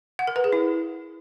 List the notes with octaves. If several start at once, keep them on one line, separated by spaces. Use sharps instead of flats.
F#5
A#4
B4
G#4
E4